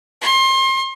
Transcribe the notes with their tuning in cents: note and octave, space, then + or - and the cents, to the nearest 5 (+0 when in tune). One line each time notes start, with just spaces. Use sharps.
C6 +30